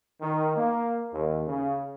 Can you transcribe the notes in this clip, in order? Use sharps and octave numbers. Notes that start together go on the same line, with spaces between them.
D#3
A#3
D#2
C#3